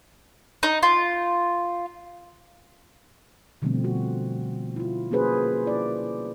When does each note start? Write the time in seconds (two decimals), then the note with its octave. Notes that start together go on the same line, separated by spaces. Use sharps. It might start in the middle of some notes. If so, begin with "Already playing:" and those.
0.63 D#4
0.83 F4
3.62 B2 D3 F3 G3 A3 C4
3.84 F#4
4.76 E4 F4
5.11 A#3 C#4 F#4 G#4 B4 C5
5.67 E4 D5